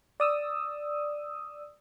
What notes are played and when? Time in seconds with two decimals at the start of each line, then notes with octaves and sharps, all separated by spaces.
0.20 D5 D#6 E6